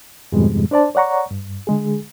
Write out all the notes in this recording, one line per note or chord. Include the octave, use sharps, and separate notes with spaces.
F2 G#2 B2 D#3 G3 G#3
D4 C5 D5 A5
C#5 D5 F#5 A#5 C#6
G2
D3 G#3 G#4